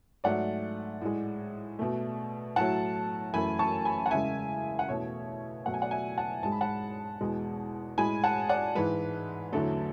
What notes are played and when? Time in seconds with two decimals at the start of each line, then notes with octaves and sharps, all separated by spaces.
0.24 G#2 F#3 A3 D5 F#5
1.01 A2 G#3
1.79 B2 A3
2.56 A2 F#3 A3 F#5 A5
3.34 F#2 E3 A3 G#5 B5
3.59 A5 C#6
3.85 G#5 B5
4.06 F#5
4.11 E2 C#3 G#3 E5 G#5
4.79 F#5
4.88 E2 B2 A3 C#5 E5
5.66 B2 F#3 A3 F#5
5.74 G#5
5.82 D5 F#5
5.91 E5 G#5
6.18 F#5 A5
6.43 G#2 G#3 A5
6.52 B5
6.61 F#5 A5
7.21 E2 B2 G#3
7.98 A2 G#3 G#5 B5
8.24 F#5 A5
8.49 D5 F#5
8.75 G#2 E3 G#3 B4
9.52 E2 D3 F#3 A3 A4